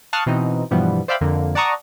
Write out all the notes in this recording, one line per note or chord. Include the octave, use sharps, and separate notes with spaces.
F5 A5 C#6 D#6 F6 F#6
B2 E3 C4 D#4
G2 B2 E3 F3 G3 B3
C5 D5 E5 F5 G5 B5
F2 D3 A#3
D5 F#5 A5 A#5 C#6 D#6